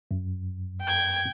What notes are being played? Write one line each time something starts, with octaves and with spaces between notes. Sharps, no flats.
F#2
G5 G#6